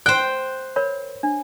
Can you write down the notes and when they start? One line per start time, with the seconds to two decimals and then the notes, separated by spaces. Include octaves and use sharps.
0.06 C5 G5 F#6
0.76 A#4 C#5 B5
1.23 D4